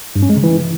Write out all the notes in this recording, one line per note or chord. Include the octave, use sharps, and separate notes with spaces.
G2
C#4
G#3
C#3
E3